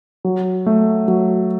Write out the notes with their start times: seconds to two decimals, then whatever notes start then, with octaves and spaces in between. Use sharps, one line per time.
0.25 F#3
0.66 A3
1.08 F#3